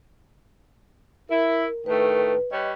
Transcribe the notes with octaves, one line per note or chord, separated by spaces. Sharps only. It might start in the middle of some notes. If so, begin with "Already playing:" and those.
E4 A#4
A2 D#3 A3 B4
G3 B4 C#5 D#5